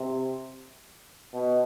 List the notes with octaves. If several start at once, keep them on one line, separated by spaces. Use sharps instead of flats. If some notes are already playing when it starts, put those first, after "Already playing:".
Already playing: C3
B2